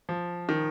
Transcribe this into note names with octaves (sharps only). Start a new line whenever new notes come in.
F3
D#3